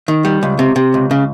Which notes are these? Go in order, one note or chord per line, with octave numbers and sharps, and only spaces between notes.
D#3
G3
C#2
C3
C3
C#2
C#3